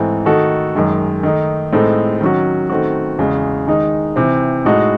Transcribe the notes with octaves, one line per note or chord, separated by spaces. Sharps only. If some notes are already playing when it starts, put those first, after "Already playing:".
Already playing: G#2 E3 A3 C4
D#3 A3 D#4 F#4 A4
F#2 D#3 G#3
D#3 A3 D#4
A2 G#3 C4 D#4 A4
D#3 F#3 C#4 F#4
D#3 A3 C4 F#4
E2 C#3 G#3
D#3 G#3 D#4
C3 E3 C4
A2 G#3 D#4 F#4 A4